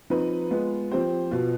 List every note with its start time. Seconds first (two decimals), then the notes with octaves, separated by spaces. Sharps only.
0.10 F3 C4 D#4 B4
0.50 G#3 B3 F4
0.91 F3 C4 G4 C5
1.31 B2 B3 F4